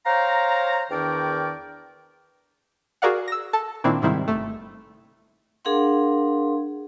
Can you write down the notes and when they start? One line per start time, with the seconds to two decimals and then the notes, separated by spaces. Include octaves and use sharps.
0.06 C5 C#5 F5 G5 A#5
0.91 E2 D#3 D4 A#4 D5 G5
3.02 F#4 G#4 A#4 D5 F5 F#5
3.28 E6 A#6
3.53 A4 A5
3.84 A#2 D#3 C4 D4 E4
4.02 G#2 C3 D#3 G3 C4 E4
4.28 G1 A3
5.65 D4 G#4 A#4 F5 F#5 C6